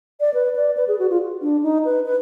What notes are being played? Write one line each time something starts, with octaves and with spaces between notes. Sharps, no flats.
D5
B4
D5
B4
G#4
F#4
F4
D4
D#4
B4
B4